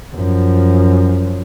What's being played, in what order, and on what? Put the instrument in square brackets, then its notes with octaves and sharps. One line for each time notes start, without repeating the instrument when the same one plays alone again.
[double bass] F#2 F3